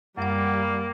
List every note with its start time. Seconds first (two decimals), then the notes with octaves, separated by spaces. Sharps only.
0.17 F#2 G3 A#3 F#5